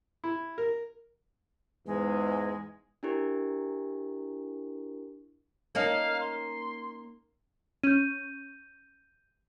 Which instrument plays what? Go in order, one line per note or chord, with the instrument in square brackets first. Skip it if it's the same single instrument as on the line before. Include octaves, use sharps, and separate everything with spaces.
[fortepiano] E4
A#4
[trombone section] E2 G#2 [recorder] G#3
[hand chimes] D4 E4 G4 A#4
[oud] A#3 C#4 D#4 [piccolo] F5
[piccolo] C6
[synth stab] C#4 [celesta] G6 D#7